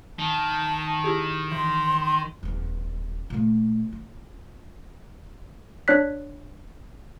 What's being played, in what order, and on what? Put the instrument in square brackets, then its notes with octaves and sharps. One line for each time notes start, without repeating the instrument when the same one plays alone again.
[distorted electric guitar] D#3 [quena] A5
[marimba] E4 G4 G#4
[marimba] E3 [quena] C6
[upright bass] D#1 E2
A#2 A3
F4
[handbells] D4 C#5 F#6 B6